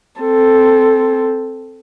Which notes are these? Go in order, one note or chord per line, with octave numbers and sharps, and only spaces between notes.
C4 A4